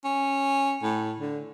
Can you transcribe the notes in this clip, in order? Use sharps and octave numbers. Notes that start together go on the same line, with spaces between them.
C#4
A2
D3